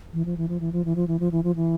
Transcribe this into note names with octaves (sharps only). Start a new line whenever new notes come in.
E3
F3
E3
F3
E3
F3
E3
F3
E3
F3
E3
F3
E3